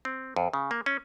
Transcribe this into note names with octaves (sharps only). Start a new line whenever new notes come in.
C4
F2
C#3
A#3
C#4